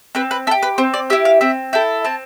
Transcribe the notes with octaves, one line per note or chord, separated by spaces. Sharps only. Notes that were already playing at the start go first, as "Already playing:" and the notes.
C4 B4
B4
E4 A4
G4
B4
C4 C5
D5
E4 G4 E5
F5
C4 E5
E4 A4 G5
C4 A5